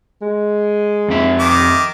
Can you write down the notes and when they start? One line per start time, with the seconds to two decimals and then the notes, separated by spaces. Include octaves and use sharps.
0.22 G#3
1.08 F2 C4 E5
1.39 D#3 D6